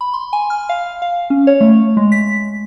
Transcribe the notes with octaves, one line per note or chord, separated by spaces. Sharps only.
B5
C6
G#5
F6
F5
F5
C#4
C#5
A3
G#3
B6